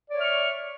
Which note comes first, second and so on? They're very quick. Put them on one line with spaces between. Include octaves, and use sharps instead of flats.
D5 C#5 E5 F6 C#6